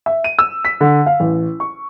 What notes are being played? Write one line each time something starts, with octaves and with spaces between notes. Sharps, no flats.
E5
D#7
E6
B6
D3
F5
A1
C#6